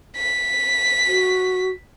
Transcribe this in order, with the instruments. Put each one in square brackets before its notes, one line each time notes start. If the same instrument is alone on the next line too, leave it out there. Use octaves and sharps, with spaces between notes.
[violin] B6
[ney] F#4